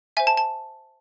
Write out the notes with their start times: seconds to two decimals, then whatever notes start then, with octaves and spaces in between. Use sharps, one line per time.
0.17 C5 E5 G#5
0.27 A5
0.37 A5